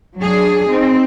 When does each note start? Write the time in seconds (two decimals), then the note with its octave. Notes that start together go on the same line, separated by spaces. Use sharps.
0.18 F#3 D4 G#4
0.69 C4 D#4